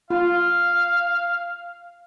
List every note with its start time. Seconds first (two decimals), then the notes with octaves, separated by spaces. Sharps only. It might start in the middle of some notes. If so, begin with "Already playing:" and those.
0.10 F4 F5